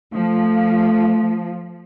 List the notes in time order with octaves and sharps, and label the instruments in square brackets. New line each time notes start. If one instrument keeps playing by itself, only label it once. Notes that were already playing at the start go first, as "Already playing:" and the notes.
[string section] F3 [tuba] A3